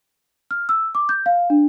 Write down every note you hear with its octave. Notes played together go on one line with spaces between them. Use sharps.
F6
E6
D6
G6
F5
D4